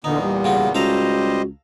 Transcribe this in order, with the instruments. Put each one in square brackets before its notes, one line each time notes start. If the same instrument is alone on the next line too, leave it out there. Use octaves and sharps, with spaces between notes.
[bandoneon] E2 A#2 B3 [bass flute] D3 [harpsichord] D#4
[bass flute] G3
[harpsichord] C#3 F4 F#4
[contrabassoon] C#2 [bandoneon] G3 C5 D#5 [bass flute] F#4 [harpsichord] A4 F5 A#5